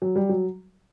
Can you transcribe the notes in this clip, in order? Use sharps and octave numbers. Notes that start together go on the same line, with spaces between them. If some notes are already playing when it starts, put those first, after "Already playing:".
F#3
G3
F#3